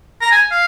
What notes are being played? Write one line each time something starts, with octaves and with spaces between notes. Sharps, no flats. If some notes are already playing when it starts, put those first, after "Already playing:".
A#5
G#5
F5